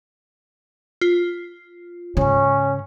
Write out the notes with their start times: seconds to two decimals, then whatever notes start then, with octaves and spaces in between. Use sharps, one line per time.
1.01 F4
2.17 G#2 C#3 C#4